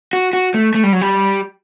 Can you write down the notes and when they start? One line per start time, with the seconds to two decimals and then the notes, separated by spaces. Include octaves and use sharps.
0.13 F#4
0.33 F#4
0.54 A3
0.74 A3
0.83 G3
0.93 F#3
1.01 G3